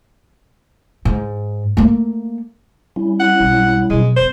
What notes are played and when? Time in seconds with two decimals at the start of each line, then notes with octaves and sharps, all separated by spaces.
1.05 G#2
1.77 A3 A#3
2.96 G3 C#4 E4
3.20 F#5
3.40 B1
3.90 B2 F#3 G#3
4.16 F2 B3 C5